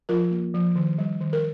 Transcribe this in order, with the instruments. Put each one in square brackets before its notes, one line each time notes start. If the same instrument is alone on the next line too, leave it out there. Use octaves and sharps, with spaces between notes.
[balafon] F3 F4 A#4
A#3
F3
D#3
G3
D#3
A#4